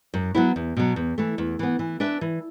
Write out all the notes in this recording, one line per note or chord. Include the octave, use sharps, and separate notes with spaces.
F#2
F#3 B3 E4
E2
B2 F#3
E2
E3 A3
E2
E3 B3
E3
D4 B4 E5
E3